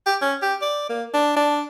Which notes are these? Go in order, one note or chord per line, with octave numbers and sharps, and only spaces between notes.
G4
C#4
G4
D5
A#3
D4
D4